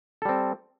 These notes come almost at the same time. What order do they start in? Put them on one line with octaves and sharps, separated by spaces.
A4 G3 C4